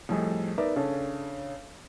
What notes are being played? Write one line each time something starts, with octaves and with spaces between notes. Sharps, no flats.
F2 A2 G3 G#4 A4 D#5
B3 D#4 A#4 B4 D5 E5
C#3 C#4 D4 A4